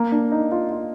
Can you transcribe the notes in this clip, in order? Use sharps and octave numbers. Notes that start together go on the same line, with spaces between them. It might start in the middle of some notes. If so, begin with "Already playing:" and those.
Already playing: A#3
D4
D#4
F4
F4